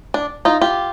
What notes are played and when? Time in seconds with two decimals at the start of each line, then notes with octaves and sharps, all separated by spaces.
0.14 D4
0.45 D#4 F4
0.61 F4 G4